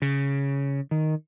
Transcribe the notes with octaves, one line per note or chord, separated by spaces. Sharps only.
C#3
D#3